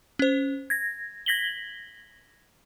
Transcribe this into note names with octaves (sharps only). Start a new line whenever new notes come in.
C#4 C5
G#6 A#6
G#6 A#6 B6 F#7 G7